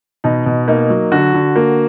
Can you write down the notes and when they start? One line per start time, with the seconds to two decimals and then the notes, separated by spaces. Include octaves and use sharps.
0.24 B2 D#4
0.46 B2
0.68 A#3 D#4
0.90 F#3
1.12 D3 F#4
1.34 D3
1.56 A#3